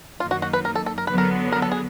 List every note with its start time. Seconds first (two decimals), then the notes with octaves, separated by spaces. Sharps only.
0.20 F#2 D#3 F#3 A#3 D#4 F4
0.31 F#4
0.42 F#4
0.53 B4
0.65 A#4
0.75 A4
0.86 A4
0.98 A#4
1.07 D3 F#3 B3 B4
1.18 A#4
1.52 A#4
1.62 A4
1.71 G#4